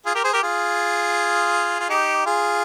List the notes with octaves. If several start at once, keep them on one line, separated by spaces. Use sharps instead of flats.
F4 G#4
G4 A#4
G#4 C5
G4 A#4
F4 G#4
F4
D#4 G4
F4 G#4